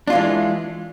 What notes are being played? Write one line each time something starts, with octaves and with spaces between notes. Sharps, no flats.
E3 G#3 D4 F4